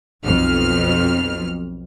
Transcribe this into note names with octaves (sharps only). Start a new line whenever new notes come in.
B1 F2 F6